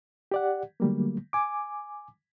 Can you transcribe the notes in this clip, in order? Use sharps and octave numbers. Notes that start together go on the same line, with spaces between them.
G4 D5 F#5
D3 F#3 G3 A3 A#3
G#5 D6